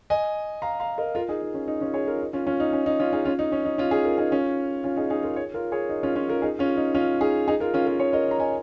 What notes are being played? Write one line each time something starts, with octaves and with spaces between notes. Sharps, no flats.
D#5 G#5
F5 A#5
F5 A#5
A#4 D#5
F4 A#4
D#4 G#4
D#4
C#4
D#4
C#4 F4
G#4 C#5
F4 A#4
D#4
C#4 F4
C#4 F4
D#4
C#4
D#4
C#4 F4
D#4 G#4
C#4 F4
D#4
C#4
D#4
C#4 F4
D#4 G#4
F4 A#4
D#4 G#4
C#4 F4
C#4 F4
D#4 G#4
D#4 G#4
F4 A#4
G#4 C#5
F4 A#4
G#4 C#5
D#4
C#4 F4
C#4 F4
F4 A#4
D#4 G#4
C#4 F4
D#4
C#4 F4
D#4 G#4
D#4 G#4
F4 A#4
C#4 F4
F4 A#4
G#4 C#5
A#4 D#5
A#5
D#5 G#5